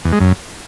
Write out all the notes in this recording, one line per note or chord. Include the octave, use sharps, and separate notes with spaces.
E2
G#3
F#2